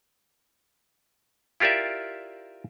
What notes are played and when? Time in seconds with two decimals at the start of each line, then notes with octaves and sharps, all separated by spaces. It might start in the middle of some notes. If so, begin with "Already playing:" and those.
1.60 E4 F4 G4 A#4 D5 E5